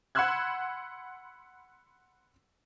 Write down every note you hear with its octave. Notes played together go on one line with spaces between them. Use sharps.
F#5 B5 C6 E6 F#6 G#6